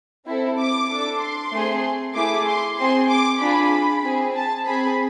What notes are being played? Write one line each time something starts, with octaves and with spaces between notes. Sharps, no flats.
C4 E4 A4
D6
D4 A4
C6
A3 C4 G#4
A3 E4 G#4 D6
C6
C4 G#4 C6
D6
D4 F4 G#4 B5
C4 G#4
A5
C4 G#4 B5